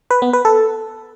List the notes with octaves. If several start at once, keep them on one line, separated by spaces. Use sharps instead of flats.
B4
B3
B4
A4